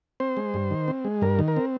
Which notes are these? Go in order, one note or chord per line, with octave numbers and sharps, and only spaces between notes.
C4 C5
G#3
G2
D#3
C4
G#3
G2 A#4
D#3
A#4
C4